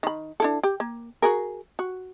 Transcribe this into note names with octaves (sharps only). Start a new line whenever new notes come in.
D#3 B5
D4 E4 A4
G4
A#3
F#4 G#4 A#4
F#4